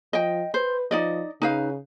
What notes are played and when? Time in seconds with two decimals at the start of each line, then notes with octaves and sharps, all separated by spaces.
0.13 F3 D#5 G5
0.54 B4 C5
0.91 F3 D#4 D5 D#5
1.42 C#3 D#4 B4 F5